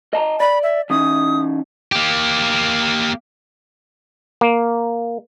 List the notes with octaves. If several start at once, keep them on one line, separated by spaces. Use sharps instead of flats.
D#5 A5 A#5
D5 B5
E5
E3 C#4 D#4 D#6
A#3 G4
A#3